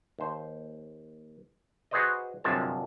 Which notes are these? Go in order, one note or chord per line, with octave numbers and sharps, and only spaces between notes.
D#2 C5
F#4 G#4 B4 C5 D5 D#5
G1 F#2 C3 F3 G#3 A5